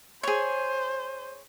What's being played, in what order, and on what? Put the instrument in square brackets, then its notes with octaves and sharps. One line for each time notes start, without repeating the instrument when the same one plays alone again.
[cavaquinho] G#4 C#5 [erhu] C5